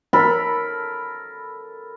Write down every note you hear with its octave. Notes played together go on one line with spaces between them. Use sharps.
A4 A#4 B5